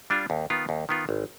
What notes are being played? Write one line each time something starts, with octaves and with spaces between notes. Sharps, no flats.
G3 D4 F4
D#2
D#3 B3 F4
D#2
D#3 B3 F4
G#1